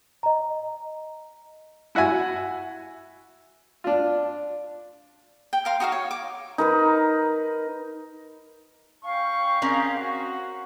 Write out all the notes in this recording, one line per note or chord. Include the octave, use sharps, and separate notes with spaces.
D#5 A#5
E4 F#4 E5 G#5
D4 F4
G5
A#4 F5 C6
D#4 F#4 A4 F5
C#5
D6
D#4 A#4 B4
C#4 F5 G5 C#6
C4 C#4 D#4 G#4 A#4
F#4